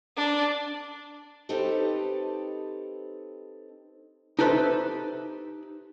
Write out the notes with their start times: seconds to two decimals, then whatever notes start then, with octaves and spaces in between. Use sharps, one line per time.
0.17 D4
1.49 C4 D#4 G4 A4 B4
4.39 D#4 G4 A4 B4 C5 E5